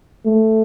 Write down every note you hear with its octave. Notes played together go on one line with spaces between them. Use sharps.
A3